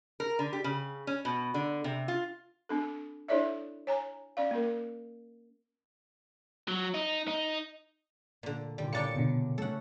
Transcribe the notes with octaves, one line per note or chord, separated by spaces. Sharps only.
A#4
D3
G4
C#3
C#4
B2
D3
C3
F4
C4 D4 A4
D4 E4 A4 C#5 D5 E5
C#5 G#5 A#5
C#4 D5 F5
A#3 C#4 A#4
F#3
D#4
D#4
A#2 D3
A#2 D3 G3
C#3 A#3 D4 D5 G5 A6 C#7
B2 D3
A3 C#4 A4 F#5 E6